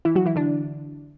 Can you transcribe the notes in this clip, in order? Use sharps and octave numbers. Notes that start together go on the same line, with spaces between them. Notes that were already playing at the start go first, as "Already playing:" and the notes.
E3 E4
F#3 F#4
E3 E4
D3 D4